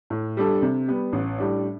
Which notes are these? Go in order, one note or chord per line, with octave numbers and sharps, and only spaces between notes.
A2
G3 D4 A4
C3
G3 B3
A1
A2 G3 D4